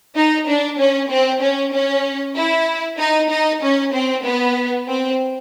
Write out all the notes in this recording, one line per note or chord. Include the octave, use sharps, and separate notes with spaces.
D#4
D4
C#4
C4
C#4
C#4
E4
D#4
D#4
C#4
C4
B3
C4